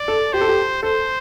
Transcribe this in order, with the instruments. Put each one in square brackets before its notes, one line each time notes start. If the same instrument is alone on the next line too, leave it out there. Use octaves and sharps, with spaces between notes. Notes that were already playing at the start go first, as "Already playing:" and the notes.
Already playing: [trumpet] D5
[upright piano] A4
[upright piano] G4 [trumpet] C5
[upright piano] A4
G4
[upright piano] A4 [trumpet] C5